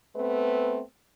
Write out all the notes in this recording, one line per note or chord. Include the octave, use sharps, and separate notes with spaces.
A3 B3 C4 B4